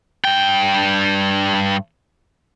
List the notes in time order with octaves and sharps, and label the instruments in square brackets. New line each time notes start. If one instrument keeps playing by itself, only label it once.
[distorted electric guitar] G2 G5